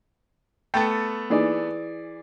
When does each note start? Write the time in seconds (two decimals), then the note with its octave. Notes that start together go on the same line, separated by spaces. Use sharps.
0.74 A3 B3 A4 G5 A6
1.30 E3 A#3 D#4 G#4 D5